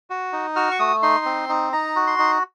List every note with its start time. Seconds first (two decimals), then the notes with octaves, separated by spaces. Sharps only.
0.10 F#4
0.33 D#4
0.56 F#4 F6
0.71 C#6
0.79 A3 D#6
1.02 D#4 C6
1.26 C4
1.49 D#4
1.73 D#4 A#5
1.96 F#4
2.07 C6
2.19 D#4